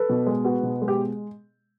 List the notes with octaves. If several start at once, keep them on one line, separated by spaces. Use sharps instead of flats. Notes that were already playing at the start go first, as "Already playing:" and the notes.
Already playing: A4 B4
B2
G#3
B3 F#4
B2
G#3
G4